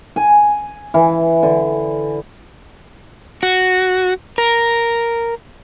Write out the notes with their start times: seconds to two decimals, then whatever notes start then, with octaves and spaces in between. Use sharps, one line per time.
0.16 G#5
0.94 E3
1.43 D3
3.43 F#4
4.38 A#4